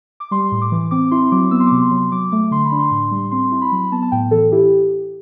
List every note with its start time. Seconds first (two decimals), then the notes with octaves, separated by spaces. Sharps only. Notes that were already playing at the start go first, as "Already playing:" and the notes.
0.20 D6
0.31 G3 C6
0.52 A2
0.61 D6
0.72 E3
0.91 C4 D6
1.11 E4 C6
1.32 F#3 D6
1.51 B3 E6
1.60 C6
1.66 C3 D6
1.82 C6
1.91 F#3
1.97 C6
2.12 F#3 D6
2.32 A3 D6
2.51 D3 C6
2.65 B5
2.72 D4
2.79 C6
2.91 A2
3.11 G3
3.31 C4 C6
3.52 E4
3.61 B5
3.72 F#3
3.92 B3 A5
4.02 A5
4.12 A2 G5
4.31 E3 A4
4.52 E4 G4